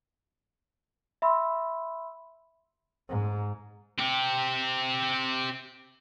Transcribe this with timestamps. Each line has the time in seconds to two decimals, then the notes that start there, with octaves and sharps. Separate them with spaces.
1.22 E5 B5 C6 E6
3.09 G#2
3.99 C4 G4